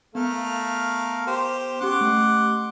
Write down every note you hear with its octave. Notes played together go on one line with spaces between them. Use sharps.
A3 B3 A#4 F5
G4 C5
C#4 G4 F#5 C6 D6
A3